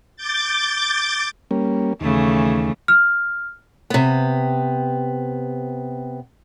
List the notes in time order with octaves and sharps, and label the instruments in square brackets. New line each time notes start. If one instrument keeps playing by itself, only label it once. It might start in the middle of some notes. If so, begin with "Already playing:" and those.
[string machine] D6 G6 A6
[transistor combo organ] G3 A#3 C#4
[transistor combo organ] D#2 [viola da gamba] C#3 E3 A3
[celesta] F6
[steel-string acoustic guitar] C3 B3